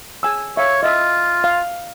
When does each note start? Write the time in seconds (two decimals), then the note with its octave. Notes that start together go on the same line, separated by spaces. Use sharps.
0.23 G#4 G#5 E6
0.57 C#5 E5 F5
0.83 F4 D#5 E5
1.44 F5